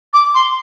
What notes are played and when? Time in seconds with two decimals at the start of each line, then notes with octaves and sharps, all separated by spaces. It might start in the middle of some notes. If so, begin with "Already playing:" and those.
0.14 D6
0.35 C6